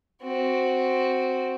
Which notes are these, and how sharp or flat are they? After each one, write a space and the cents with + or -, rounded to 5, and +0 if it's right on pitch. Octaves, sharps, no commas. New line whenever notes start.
C4 +0 F#4 +0